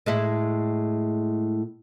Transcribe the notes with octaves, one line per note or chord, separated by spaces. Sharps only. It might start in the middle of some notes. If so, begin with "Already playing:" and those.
A2 G#3 E4